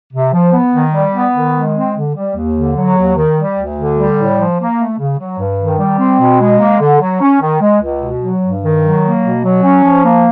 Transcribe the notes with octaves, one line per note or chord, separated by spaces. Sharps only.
C3
F3
B3
D#3
G3
B3
D#3
G#3
C4
D3
G3
D#2
D3
F#3
D#2
D#3
G3
D2
D3
G3
A2
F3
A#3
A3
C#3
F#3
G2
D#3
G3
C4
B2
G#3
A#3
D3
F#3
C#4
D#3
G#3
C#2
B2
F#3
G2
D#3
F#3
A#3
B2
F#3
C#4
F3
A#3